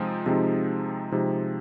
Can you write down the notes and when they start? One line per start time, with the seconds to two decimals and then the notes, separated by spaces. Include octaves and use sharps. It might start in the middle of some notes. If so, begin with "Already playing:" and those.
Already playing: C3 F3 G#3 C4 D#4
0.26 C3 F3 G#3 C4 D#4
1.12 C3 F3 G#3 C4 D#4